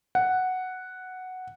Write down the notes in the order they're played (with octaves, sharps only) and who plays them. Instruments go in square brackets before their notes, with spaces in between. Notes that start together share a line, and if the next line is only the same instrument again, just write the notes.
[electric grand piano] F#5